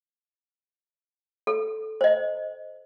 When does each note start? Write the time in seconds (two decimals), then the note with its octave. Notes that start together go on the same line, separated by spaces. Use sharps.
1.47 A4
2.01 C5 D#5